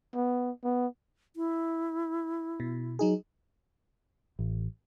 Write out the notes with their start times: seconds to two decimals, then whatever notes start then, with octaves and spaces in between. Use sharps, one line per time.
0.15 B3
0.64 B3
1.36 E4
2.60 B2
2.99 F#3 D#4 G#4
4.39 A1